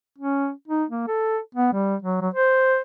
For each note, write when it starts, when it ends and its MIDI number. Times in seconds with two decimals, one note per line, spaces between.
0.18 0.51 61
0.68 0.85 63
0.91 1.05 58
1.08 1.39 69
1.55 1.73 59
1.73 1.96 55
2.03 2.21 54
2.21 2.29 54
2.34 2.80 72